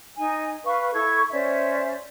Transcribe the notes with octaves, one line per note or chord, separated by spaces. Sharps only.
D#4 G#5
B4 F5 C#6
E4 A4 C#6 G#6
C#4 C5 D5 E5